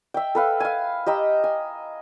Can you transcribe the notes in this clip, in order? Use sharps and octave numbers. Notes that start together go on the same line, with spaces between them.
E5 G5
A4 B4 F5
F5 G#5
G4 D#5 A#5 E6
G#5